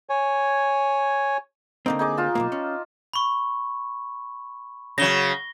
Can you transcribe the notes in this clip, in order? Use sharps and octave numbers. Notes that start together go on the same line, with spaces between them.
C#5 G#5
D3 A#3 C4 D#4
D#4 G#4 D6
F4 A5
B1 G#2 A#3
C#4
B5 C#6
C#3 F#3 A#6 G7